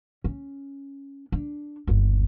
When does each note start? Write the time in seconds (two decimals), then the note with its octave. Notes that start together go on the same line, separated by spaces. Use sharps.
0.24 C#4
1.32 D4
1.87 G1 D#2